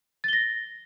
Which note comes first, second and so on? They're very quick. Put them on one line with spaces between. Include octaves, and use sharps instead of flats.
A6 G7 A#6